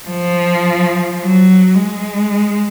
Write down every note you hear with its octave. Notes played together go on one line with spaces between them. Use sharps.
F3
F#3
G#3